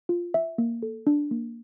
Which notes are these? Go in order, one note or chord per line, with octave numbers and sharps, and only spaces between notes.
F4
E5
A#3
A4
D4
A#3